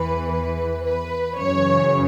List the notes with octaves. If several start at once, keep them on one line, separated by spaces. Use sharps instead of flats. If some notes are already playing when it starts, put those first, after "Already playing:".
Already playing: E2 E3 B4
B4
B4
F#2 C#3 E3 C#5